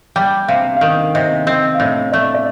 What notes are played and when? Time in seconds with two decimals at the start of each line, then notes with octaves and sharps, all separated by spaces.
0.16 G3 G5
0.48 C3 F5
0.76 F5
0.81 D#3 D#5
1.15 C3 D#5
1.47 C4 D#5
1.74 F5
1.80 A2 D#5
2.12 A3 D5
2.34 D5